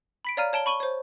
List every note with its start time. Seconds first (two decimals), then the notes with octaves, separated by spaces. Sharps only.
0.25 B5 B6 D7
0.37 C#5 D5 F5 A#5 F6 D#7
0.53 C#5 A5 D7 G7
0.66 B5 C#6 D#7 F#7 G7
0.80 C5 C#5